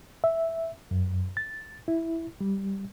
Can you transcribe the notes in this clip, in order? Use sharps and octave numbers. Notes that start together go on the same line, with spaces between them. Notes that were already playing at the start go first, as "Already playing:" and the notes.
E5
F#2
A6
E4
G3